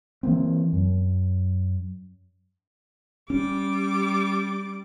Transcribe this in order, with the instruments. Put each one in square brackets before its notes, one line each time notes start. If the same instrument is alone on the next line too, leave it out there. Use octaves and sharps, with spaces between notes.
[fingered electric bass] E3 F#3 A#3 C4
F#2
[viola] G3 D6 [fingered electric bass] C#4